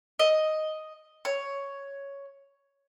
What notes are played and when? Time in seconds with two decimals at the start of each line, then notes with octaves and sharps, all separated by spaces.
0.19 D#5
1.25 C#5